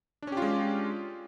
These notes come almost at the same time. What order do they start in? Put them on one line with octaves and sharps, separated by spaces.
D4 C#4 G4 F4 G#3